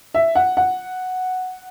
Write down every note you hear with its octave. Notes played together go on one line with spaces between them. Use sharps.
E5
F#5
F#5